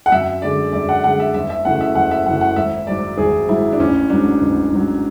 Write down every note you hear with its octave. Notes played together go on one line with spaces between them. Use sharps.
F#5
F#2 E5
D3 G#3 D5
F#2 D5
F#5
D3 G#3 F#5
E5
F#1 E5
E5
F#2 C#3 E3 A3 F#5
E5
F#1 F#5
E5
F#2 C#3 E3 A3 F#5
F#5
G#1 E5
G#2 F#3 D5
G#1 G#4
G#2 F#3 E4
D4
A1 C#4
G#2 F#3 D4
A1
G#2 F#3